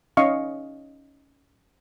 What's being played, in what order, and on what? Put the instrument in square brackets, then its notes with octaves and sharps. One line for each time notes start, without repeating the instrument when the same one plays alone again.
[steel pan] C#4 D#4 D#5 F5 C#6